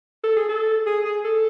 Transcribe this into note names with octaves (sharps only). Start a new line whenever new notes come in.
A4
G#4
A4
G#4
G#4
A4